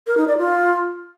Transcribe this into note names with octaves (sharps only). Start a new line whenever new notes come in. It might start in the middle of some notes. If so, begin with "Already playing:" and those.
A#4
D#4
D5
F4